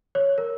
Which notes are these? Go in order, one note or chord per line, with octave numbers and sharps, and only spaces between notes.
C#5
A#4